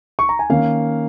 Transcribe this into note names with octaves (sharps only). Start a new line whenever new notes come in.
C#6
A#5
G#5
D#3 A#3 C#4 F5